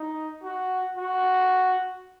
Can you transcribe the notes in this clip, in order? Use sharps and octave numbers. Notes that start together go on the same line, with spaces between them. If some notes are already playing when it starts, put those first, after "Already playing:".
Already playing: D#4
F#4
F#4